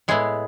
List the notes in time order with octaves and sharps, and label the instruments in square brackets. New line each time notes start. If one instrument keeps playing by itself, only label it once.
[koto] A2 G#3 B3 E4 G#4